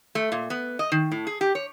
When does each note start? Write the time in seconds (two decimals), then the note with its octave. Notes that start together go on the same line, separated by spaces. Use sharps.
0.15 A3
0.32 A#2
0.50 B3
0.79 D#5
0.92 D#3
1.12 A2
1.27 G#4
1.41 G4
1.55 C#5